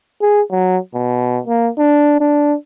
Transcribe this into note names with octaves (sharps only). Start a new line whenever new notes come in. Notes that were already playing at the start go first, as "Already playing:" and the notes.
G#4
F#3
B2
A#3
D4
D4